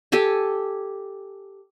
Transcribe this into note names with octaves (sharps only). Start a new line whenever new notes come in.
G4 A4 G#5 A5